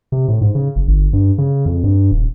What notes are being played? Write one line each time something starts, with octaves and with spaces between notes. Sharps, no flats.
C3
A2
G#2
C#3
F#1
G1
G2
C#3
F2
G2
D#1